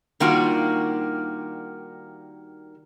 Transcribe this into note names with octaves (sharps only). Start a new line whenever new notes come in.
D#3 G3 A#3 D4 F4 F#4